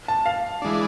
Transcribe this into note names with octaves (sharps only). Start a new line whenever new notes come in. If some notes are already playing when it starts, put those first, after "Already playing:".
A5
F5
E3 G#3 D4